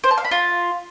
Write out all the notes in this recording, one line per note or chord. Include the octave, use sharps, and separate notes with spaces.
C5
A5
F5
B5
F4